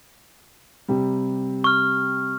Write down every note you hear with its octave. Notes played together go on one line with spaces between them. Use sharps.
C3 G3
C#6 F6